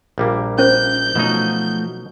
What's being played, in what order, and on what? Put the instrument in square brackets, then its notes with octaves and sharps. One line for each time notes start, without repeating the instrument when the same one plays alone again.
[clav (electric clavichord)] A#1 G3 A#3
[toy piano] C#4 C5 [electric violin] G6
[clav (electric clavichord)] B2 F#3 D#4 [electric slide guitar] F3 A3 F#4